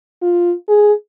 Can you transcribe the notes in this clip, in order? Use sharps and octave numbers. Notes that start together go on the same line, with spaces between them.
F4
G#4